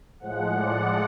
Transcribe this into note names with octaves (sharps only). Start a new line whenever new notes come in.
A2 F3 G#3 F#5
D5